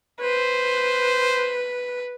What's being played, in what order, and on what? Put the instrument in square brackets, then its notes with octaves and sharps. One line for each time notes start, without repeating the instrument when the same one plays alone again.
[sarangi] B4 [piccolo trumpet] C5